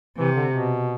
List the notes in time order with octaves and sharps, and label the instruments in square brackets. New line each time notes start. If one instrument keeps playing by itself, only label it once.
[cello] C3 [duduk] E3
[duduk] D3
B2